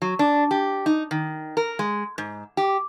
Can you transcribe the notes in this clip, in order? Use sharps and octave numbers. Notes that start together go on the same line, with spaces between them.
F#3
D4
G4
D#4
D#3
A#4
G#3
G#2
G4